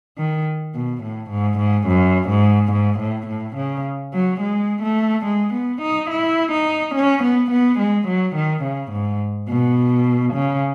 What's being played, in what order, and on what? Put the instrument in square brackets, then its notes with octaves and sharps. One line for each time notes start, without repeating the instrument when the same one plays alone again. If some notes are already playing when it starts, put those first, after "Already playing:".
[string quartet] D#3
B2
A2
G#2
G#2
F#2
G#2
G#2
A2
A2
C#3
F#3
G#3
A3
G#3
B3
D#4
E4
D#4
C#4
B3
B3
G#3
F#3
D#3
C#3
G#2
B2
C#3